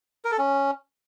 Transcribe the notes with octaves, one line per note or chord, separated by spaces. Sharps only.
A#4
A4
C#4